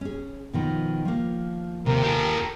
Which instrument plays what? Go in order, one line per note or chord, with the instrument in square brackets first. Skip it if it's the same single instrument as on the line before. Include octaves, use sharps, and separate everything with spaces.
[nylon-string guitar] C#4 G#4
B2 D#3 F3
F3 A#3
[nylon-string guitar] D#2 [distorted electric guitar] C3 [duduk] A#4
[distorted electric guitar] G4 A4